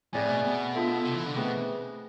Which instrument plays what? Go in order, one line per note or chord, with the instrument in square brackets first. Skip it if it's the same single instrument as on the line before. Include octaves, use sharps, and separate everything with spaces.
[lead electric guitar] A2 [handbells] A3 C4 G#4 D5 G#5
[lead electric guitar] B2
B2
[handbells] D4 F4 A4 E5
[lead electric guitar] C3
E3
D3
[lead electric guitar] B2 [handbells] A3 C4 G#4 B4